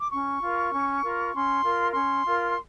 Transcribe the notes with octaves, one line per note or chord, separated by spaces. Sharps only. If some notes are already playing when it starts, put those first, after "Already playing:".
D6
C#4 C#6
F4 A#4
C#4
F4 A#4
C#4 C6
F4 A#4
C#4 C6
F4 A#4